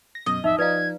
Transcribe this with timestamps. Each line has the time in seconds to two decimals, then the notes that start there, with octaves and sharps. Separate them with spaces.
0.15 A#6
0.26 F#2 B2 D#5
0.44 A1 F2 D#4 E5
0.58 F3 D#4 B4 D5 F5 G#6